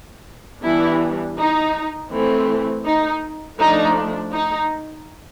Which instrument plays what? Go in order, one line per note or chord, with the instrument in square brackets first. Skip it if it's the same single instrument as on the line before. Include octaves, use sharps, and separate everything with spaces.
[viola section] E3 G3 B3 D4 E4
D#4
E3 A3 C4
D#4
F3 A3 D4 D#4
D#4